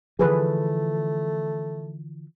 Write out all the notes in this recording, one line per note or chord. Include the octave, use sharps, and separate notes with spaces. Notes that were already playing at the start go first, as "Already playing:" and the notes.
D3 E3 F3 A3 G#4 B4